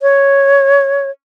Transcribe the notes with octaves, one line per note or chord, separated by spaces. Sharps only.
C#5